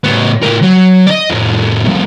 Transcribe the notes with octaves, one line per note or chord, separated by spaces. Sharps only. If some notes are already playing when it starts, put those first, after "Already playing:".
A2 B3
A2 A#4
F#3
D5 D#5
F2 A2
C2 F3